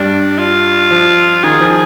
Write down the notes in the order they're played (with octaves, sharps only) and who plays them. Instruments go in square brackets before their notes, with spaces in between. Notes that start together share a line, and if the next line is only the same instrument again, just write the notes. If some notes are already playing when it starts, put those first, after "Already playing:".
Already playing: [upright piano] G2 G3 [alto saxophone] D4
[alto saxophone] F4
[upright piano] F3
[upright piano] D#3 [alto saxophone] G#4
[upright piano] F3